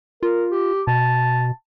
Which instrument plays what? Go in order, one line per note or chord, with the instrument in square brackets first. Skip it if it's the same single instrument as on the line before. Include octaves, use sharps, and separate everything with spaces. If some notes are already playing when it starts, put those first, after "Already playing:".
[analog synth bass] F4 [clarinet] A#4
[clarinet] G4
[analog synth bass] B2 [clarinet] A5